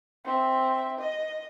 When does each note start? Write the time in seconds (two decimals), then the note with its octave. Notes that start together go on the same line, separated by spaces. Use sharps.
0.25 C4 E5
0.98 D#5